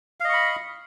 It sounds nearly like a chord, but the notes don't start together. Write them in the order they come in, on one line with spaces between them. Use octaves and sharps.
F5 D#5 C#6 B5